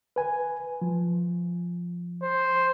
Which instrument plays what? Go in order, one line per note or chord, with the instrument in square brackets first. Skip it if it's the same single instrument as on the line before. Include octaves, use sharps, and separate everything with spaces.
[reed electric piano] B4 G#5
F3
[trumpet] C5